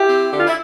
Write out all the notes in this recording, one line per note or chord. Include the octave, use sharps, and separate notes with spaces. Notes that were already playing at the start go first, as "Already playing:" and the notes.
Already playing: E4 G4
C4
D3 G4
F4
E4